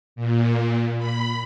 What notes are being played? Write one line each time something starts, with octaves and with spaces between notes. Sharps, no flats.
A#2
B5